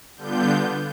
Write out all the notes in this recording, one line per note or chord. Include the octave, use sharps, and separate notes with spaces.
D3 G3 B3 D4 F4 G6